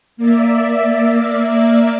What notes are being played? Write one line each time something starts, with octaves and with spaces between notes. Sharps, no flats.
A#3 D5 E5